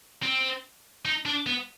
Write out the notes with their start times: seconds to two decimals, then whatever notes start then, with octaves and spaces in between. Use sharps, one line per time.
0.23 C4
1.05 D#4
1.25 D4
1.47 B3